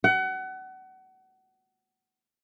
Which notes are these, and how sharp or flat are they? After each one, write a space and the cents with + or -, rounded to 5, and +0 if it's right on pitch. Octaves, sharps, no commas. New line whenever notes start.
F#5 +30